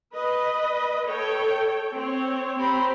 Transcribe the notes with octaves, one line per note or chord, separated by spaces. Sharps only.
B4 D#5
A4 C#5 G5
C4 C#5
C4 G4 C5 A#5 B5